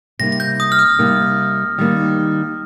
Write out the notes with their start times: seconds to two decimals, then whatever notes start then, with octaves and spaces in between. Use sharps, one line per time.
0.19 C3 G3 A#3 D#4 A#6
0.32 A#6
0.40 G6
0.60 D#6
0.72 F6
0.79 D#6
0.99 C3 G3 A#3 D#4
1.78 D#3 G3 A#3 D#4